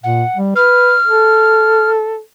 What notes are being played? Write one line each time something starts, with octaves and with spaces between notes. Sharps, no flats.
A#2 F#5
G3
B4 F6
A4